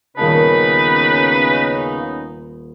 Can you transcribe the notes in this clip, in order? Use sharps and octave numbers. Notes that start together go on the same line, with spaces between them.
D#1 C#3 B3 C#4 D#4 A#4 B4 A5